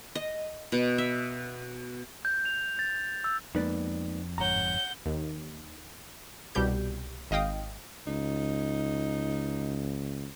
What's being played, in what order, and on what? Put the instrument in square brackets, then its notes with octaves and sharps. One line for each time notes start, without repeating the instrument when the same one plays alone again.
[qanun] D#5
B2
E5
[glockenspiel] G6
F7
A6
E6
[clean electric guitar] F2 [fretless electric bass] G#3 A#3 B3 [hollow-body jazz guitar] D#4 B4 D5
[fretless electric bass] G1 G#2 [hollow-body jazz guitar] C#5 A#5 [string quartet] F#5 G6
[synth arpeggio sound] D#2
C2 B2 G3 G4 G6
G#1 D#5 F5 G5 D#6
[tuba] C#2 [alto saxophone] D#4